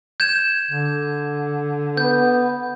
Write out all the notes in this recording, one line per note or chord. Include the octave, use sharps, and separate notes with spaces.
G6 G#6 E7
D3
B3 G6